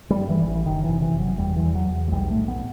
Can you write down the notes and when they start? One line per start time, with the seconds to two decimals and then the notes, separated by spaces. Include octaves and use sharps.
0.10 G3
0.17 G2
0.29 E3
0.41 A1
0.46 E3
0.66 F#1 D#3
0.84 E3
0.90 C3
1.02 E3
1.14 F#1
1.20 F#3
1.38 E2 G3
1.56 E3
1.63 E2
1.75 F#3
1.87 E2
2.08 F#3
2.11 B1 G3
2.30 A3
2.36 A2
2.48 B3